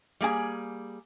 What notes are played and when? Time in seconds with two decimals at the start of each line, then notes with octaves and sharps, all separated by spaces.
0.21 G3 A#3 G#4 G#5